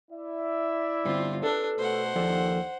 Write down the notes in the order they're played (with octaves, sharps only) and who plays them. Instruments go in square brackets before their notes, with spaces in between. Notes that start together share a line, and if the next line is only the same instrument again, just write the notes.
[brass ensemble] E4 D5 E5
[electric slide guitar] G2 D3 [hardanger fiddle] C4 F4
[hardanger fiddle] D4 [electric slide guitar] A4 B4
[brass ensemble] B2 A3 [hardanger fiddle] C5 F#5
[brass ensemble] D#2 [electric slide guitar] F3 A4 D5